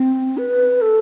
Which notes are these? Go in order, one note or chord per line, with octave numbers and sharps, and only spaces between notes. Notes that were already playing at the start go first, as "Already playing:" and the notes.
Already playing: C4
B4
A4